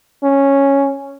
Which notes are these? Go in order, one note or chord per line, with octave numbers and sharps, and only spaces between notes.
C#4